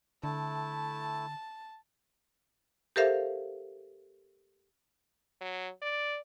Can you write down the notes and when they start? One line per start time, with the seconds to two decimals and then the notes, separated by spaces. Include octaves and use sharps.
0.24 D3 A3 E4 A5
2.96 G4 A4 A#4 C5 E5 F5
5.41 F#3
5.82 D5